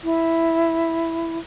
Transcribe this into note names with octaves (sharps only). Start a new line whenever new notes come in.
E4